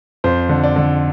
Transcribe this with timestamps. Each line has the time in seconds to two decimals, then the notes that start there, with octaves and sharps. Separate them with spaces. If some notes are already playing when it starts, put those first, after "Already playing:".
0.24 F2 C5
0.49 D3
0.64 D5
0.76 D3